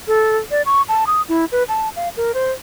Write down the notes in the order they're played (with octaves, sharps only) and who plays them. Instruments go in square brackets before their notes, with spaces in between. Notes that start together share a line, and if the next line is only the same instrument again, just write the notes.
[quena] A4
D5
C#6
A5
D#6
E4
B4
A5
F5
A#4
C5